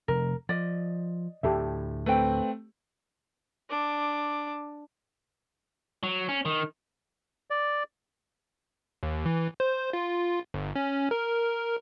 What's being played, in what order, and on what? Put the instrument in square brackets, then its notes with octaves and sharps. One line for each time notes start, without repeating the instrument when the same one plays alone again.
[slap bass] F1 [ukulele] A#4
[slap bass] F3 [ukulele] D5 D#5
[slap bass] D2 A2 [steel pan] G4 A4 E5
[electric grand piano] A3 C4 [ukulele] B4 G5
[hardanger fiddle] D4 D6
[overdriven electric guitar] F#3
C#4
D#3
[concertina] D5
[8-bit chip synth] D#2
E3
C5
F4
G1
C#4
A#4